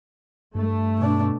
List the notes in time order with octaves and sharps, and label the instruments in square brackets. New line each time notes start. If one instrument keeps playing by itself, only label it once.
[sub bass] G2 [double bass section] A3
[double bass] B2 D4